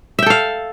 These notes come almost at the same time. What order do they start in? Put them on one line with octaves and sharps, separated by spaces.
E5 G5 A4 F5